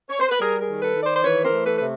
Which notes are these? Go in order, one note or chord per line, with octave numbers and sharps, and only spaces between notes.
C#5
C5
B4
G3 G#4 A#4
G#4 A#4
D#3
A4 B4
D#3
C5 D5
C5
E3 B4 C#5
A#4 C5
A3
A4 B4
C3 B4